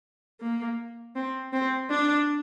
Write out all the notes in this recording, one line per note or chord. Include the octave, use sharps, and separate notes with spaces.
A#3
C4
C4
D4